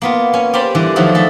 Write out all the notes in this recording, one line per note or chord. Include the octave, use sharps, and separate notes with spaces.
A#3 B3 F4
C#4 G#5
G4 A#4 C5 A5 B5
D3 E3 G3
D3 D#3 F3 F#3 A3
A3 G#4 A4 E5